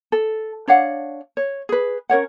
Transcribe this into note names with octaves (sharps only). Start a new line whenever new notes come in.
A4
D4 C#5 F5 F#5
C#5
G#4 B4
C#4 A#4 C#5 F#5